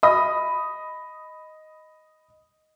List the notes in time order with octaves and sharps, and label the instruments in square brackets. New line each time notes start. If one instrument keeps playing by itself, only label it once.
[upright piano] D#5 B5 D#6